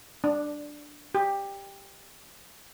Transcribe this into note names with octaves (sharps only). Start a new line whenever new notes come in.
D4
G4